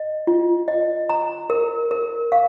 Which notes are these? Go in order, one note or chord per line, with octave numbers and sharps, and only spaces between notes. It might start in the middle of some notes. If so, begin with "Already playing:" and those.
Already playing: D#5
F4
D#5
A#5
A#4
A#4
F5